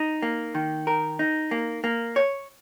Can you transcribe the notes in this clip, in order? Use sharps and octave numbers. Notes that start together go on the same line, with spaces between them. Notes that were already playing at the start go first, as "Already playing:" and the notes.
Already playing: D#4
A#3
D#3
A#4
D#4
A#3
A#3
C#5